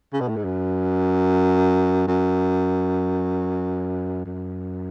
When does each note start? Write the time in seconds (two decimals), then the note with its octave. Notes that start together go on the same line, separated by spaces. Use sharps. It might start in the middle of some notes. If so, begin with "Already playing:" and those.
0.13 C#3
0.20 B2
0.28 A2
0.36 G#2
0.44 F#2
2.07 F#2
4.25 F#2